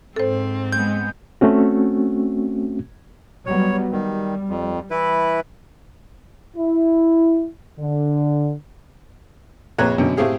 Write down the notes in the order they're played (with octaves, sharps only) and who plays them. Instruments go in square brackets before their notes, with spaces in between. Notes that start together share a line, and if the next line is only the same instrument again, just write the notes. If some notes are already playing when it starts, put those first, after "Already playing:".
[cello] G#2 C4 [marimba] A4 C5
[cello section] G#3 B3 [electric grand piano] G6
[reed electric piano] A3 C4 C#4 F#4
[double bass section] F#3 G3 B3 [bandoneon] C#5
[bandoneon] D#3 [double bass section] G3
[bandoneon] F2
E3 E4 B4
[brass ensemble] E4
D3
[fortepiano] A#1 F2 B4 C#5 A#5 F#6
F#2 B2 D3 C#4
A2 A3 C4 G4 G#4 F5